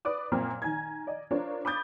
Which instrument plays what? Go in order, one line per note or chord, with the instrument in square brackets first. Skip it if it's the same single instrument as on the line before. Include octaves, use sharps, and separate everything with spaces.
[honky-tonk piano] B4 D5 D6 D#6
F#2 A#2 A#3 C4 F6
D#3 G#5 A#5 G#6
D5 D#5
D4 F4 A#4 C5 C#5
B5 D6 D#6 G6 A6